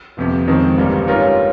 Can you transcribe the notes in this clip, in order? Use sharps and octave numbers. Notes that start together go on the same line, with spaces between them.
G1 F2 C3
F2 D#3 G#3 C4
G1 G2 G3 A#3
G#2 G3 C#4 F4 A#4